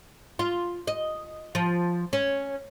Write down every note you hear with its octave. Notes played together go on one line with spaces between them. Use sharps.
F4
D#5
F3
C#4